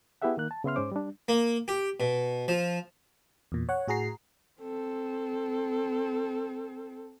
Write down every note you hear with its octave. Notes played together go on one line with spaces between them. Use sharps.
B3 E4 G4 G#4 E5 F#5
D#3 A#3 F#6
A5
C#3 B3 E5 C6 F6
G#2 G#3 C#4 C5 D6
G3 D4
A#3
G4
B2
F3
E2 A#2
C#5 F#5
A2 F#4 G#4 A#5 C7
C4 A4